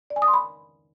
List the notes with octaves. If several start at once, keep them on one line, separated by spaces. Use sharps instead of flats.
D5
G#5
D#6
C6
B5